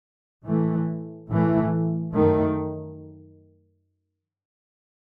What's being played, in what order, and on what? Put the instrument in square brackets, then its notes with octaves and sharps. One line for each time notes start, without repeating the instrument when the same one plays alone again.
[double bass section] A2 E3 A3
A2 E3 A3
F#2 D#3 A3